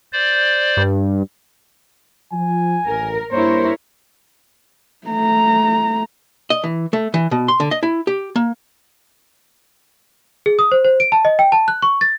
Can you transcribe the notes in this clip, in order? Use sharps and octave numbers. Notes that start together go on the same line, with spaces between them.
C5 D5
G2
F3 G#5
A1 A#4
G2 A#3 E4 A#4 C5 C#5
A3 A#5
D#5
E3
A3
E3
B2
C6
D3
D#5
E4
G4
A#3
G#4
D#6
C5
C5
D7
A5
D#5
G5
A5
F#6
C#6
A6